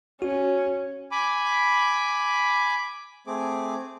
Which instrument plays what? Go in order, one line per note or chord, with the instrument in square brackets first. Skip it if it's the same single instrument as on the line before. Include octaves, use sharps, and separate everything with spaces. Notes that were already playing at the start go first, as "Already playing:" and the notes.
[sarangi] C#4 [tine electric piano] F#4
[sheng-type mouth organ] G#5 B5 D6
A3 C4 G#4 D6